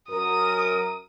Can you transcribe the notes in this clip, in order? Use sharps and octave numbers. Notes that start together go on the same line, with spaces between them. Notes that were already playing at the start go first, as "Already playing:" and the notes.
F#2 A#4 D#6